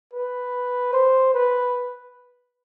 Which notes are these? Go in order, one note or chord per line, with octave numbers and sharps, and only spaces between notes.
B4
C5
B4